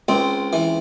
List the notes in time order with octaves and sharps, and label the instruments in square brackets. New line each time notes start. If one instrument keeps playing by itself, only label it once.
[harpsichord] C#2 C4
E3